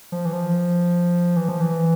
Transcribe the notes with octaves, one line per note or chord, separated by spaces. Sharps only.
F3
E3
F3
E3
F3
E3